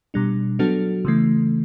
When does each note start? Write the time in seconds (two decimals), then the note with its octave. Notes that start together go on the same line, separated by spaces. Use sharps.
0.14 B2 G3 D4
0.59 F#3 B3 D4 F#4 A4
1.05 C#3 E3 A3